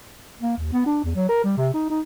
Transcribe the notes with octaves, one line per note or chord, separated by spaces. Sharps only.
A#3
D#2
B3
D4
E2
F#3
A#4
G3
C3
D#4
D#4